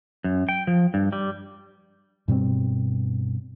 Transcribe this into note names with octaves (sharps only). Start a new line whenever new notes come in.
F#2
G5
F3
G2
G3
G2 B2 G3 C4